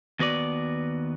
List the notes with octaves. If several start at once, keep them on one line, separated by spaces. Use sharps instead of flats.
D#2 B3 F#4 B4 D5